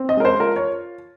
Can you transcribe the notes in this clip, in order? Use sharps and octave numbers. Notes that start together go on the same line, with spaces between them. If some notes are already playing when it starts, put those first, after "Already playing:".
Already playing: C4
D#5
G#3 A#4
C5
F4 A#4
C#5